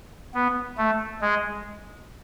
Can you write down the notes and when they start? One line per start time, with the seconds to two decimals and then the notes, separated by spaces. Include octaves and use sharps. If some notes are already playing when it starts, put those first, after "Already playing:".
0.34 B3
0.78 A3
1.21 G#3